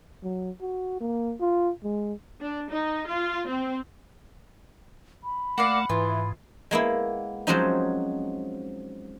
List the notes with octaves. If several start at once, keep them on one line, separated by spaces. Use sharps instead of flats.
F#3
F#4
A#3
F4
G#3
D4
D#4
F4
C4
B5
A3 A#3 D5 F5 F#5
G#2 E3 F4
G#3 A#3 B3 E4
F3 F#3 G#3 C4 C#4 D#4